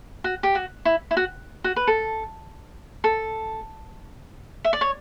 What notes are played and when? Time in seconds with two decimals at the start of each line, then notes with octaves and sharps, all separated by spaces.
0.24 F#4
0.43 G4
0.55 F#4
0.85 E4
1.11 E4
1.17 F#4
1.64 F#4
1.76 B4
1.87 A4
3.04 A4
4.64 E5
4.73 D5
4.81 C#5